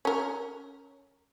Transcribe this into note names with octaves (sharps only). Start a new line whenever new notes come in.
C#4 A#4